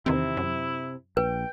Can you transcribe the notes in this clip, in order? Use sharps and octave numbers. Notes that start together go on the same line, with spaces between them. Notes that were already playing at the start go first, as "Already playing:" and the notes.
E2 C3 D#3 C4 E4
F#2
A#1 B4 G5